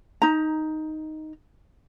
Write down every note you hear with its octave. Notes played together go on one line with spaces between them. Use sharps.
D#4 A#5